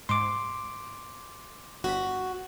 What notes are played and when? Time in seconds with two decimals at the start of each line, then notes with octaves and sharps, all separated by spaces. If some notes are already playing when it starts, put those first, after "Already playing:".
0.09 G#2 C6 D6
1.84 G1 F#4 B6